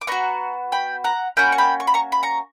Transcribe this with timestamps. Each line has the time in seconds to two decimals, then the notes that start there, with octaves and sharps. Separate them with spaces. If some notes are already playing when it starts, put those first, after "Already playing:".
0.01 D6
0.07 B3 F#4 A#5 C#6
0.72 G5 B5
1.04 F#5 A#5
1.37 A#3 C#4 F#4 G5 B5
1.52 C#6
1.58 G5 B5
1.80 C#6
1.87 B5
1.94 A#5 C#6
2.12 B5
2.23 A#5 C#6